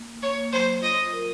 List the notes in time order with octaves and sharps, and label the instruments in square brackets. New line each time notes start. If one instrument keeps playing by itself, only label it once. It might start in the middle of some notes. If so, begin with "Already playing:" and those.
Already playing: [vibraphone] A#3
[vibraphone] A#3 [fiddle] C#5
[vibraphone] F#3 [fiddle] C5
[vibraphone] F4 [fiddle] D#5
[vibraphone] A#4